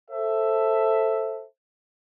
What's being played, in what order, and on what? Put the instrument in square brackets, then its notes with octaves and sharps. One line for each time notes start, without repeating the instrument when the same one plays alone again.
[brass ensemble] A4 C5 E5